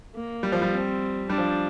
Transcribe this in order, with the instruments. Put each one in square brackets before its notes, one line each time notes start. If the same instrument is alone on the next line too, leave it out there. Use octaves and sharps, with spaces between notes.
[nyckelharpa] A#3
[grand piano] G3
F3
G3
[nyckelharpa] C4
[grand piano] G3 [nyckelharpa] D4
[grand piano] F3